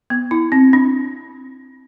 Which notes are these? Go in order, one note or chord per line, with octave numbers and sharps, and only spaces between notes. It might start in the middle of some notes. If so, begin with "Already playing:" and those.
B3
E4
C4
D4